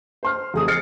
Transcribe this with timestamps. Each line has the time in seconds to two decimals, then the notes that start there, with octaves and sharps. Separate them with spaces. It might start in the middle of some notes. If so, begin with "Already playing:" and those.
0.23 C5 C6 F6
0.54 F1 G#4 D#6
0.68 F6 A6 C7 C#7